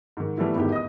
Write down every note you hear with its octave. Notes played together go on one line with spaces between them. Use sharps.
G#2 D#3
E3 G3 A3 B3 E4
G1 E2 G#2 D#3 E4 G4
D#5 D#6